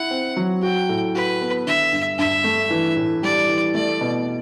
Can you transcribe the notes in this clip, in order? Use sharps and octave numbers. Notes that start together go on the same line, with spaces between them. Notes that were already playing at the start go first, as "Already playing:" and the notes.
Already playing: E4 F#5
C4
F#3
F#4 G5
A2
F#4 B4
B3
D3 E5
G2
G2 E5
A3
E3
A2
G3 D5
E3
A3 D5
B2